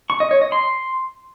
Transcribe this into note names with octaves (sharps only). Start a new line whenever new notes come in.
C#6
D#5
C#5
D#5
C6